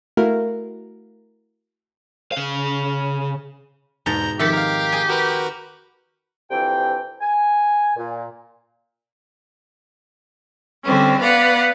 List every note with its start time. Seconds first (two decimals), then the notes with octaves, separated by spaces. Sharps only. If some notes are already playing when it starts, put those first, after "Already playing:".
0.17 A3 E4 F#4 A#4 F5
2.32 C#3 F5
4.06 E2 G#2 B2 A5 A#5 G6
4.39 F2 D#3 G4 E5 F#5 A6 B6
4.53 A#4 F5
4.92 G#4 G5 G#5
5.09 F#4 A#4 B4
6.51 D2 C3 E3 F3 G5
7.21 G#5
7.97 A#2
10.83 D3 G3 C4 C#4
11.20 B3 B4 D5 F5 F#5